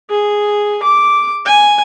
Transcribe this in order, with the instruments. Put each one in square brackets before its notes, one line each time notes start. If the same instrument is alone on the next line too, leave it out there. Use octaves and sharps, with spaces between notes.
[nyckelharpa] G#4
D6
G#5